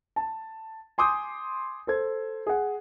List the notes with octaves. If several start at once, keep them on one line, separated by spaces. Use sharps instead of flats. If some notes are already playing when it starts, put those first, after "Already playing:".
A5
G#5 C6 D6 D#6 G6
A4 C5 G#6
G#4 F#5